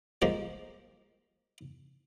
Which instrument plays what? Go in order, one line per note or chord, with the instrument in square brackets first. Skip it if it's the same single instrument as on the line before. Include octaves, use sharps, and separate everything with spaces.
[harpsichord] F3 G#3 A#3 G4